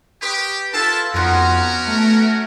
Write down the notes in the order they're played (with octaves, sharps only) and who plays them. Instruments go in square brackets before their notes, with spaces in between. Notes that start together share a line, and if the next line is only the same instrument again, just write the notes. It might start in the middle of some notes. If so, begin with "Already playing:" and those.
[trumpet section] G4 [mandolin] B4 C#6 D#6
[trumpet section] E4 A5 [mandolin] F4 A4 B4
[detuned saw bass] F2 [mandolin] B3 D#4 C6 [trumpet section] C#4 F#4 A#4
[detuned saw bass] A3